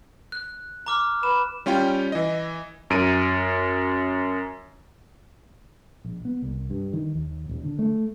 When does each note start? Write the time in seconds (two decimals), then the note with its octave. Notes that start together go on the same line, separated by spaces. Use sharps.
0.32 F#6
0.86 A#5 D6 F6
1.23 B4 E7
1.66 G3 C#4 F4 G5
2.12 E3 D#5
2.90 F#2 D7 D#7
6.04 A#1
6.25 B3
6.42 C2
6.70 G2
6.93 D#3
7.15 D#2
7.49 D#1
7.64 D3
7.79 A3